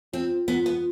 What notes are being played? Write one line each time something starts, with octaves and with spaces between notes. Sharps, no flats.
C4 F4
B3 F4
B3